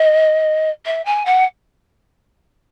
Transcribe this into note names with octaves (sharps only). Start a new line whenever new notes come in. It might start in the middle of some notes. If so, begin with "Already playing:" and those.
Already playing: D#5
E5
G#5
F#5